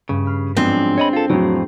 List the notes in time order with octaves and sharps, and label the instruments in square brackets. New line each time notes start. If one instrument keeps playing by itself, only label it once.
[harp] G2 [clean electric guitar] C#3
[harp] B5 F6 C7
[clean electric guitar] G#2 F3 F#3 [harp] G#3 B3 D4 [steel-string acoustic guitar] C4
[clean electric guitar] C#5 D#5 B5
F4 A4
[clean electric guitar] F2 A2 [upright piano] F#3